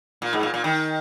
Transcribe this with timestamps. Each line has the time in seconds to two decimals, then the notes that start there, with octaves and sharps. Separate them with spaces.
0.22 A#2
0.33 G#2
0.43 A#2
0.54 A#2
0.64 D#3